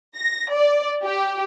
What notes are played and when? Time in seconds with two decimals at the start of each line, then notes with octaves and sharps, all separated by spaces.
0.16 A#6
0.53 D5
1.04 G4